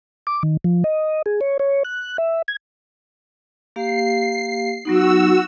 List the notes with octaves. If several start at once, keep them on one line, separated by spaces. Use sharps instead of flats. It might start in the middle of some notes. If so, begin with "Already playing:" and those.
D6
D#3
F3
D#5
G#4
C#5
C#5
F#6
E5
G#6
A#3 G4 F5 C7
F#3 B3 D#4 F#4 E6